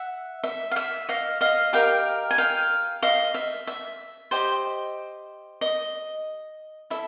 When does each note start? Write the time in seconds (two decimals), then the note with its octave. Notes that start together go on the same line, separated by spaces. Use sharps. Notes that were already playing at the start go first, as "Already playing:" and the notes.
Already playing: E5 F#5
0.44 E5
0.71 F5
0.76 E5
1.09 D#5 F5
1.41 D#5 F5
1.73 G4 A#4 D#5 F5 G5
2.31 G#5
2.38 F5 G5
3.03 D#5 F5
3.34 E5
3.67 E5
4.31 G4 C5 D#5
5.61 D#5
6.90 E4 A4 E5